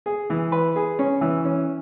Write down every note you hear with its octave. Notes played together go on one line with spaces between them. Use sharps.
G#4
E3
B4
G#4
C#4
E3
C#4